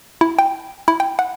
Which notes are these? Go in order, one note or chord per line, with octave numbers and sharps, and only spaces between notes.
E4
G5
E4
G5
F#5